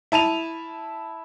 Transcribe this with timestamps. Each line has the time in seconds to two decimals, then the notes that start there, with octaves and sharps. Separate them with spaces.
0.12 E4 A5 D#7 F7